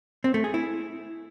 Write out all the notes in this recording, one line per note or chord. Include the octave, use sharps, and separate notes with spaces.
C4
A3
G#4
E4